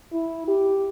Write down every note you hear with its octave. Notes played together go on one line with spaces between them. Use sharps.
E4
G4